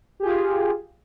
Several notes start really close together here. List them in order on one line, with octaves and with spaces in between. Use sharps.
G4 G#4 F4